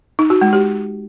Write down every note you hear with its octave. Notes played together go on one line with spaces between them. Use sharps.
D#4
F#4
G#3
G4